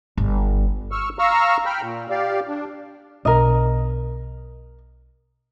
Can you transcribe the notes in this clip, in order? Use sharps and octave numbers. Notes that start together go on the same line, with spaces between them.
G1
C#6 E6 F6
F5 A#5 C#6 E6 F6
G5 B5 F6
A#2
G4 D5 F5
D4
B1 B2 D4 A#4 D#5